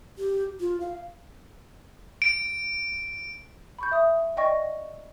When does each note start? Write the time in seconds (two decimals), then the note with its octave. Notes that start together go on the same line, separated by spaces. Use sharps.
0.18 G4
0.60 F4
0.80 F5
2.22 D7
3.79 B5 C#6 G6
3.92 E5 D#6
4.37 D5 D#5 G5 G#5 C#6 A#6